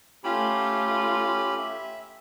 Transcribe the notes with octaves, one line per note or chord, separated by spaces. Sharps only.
A3 C#4 F4 G4 B5
E5